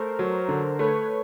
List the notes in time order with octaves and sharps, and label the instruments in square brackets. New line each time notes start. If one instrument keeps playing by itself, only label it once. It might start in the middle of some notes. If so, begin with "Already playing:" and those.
Already playing: [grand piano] A3 [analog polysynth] A#4 C5
[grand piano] F#3
D3
[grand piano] A3 [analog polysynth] B4 C#5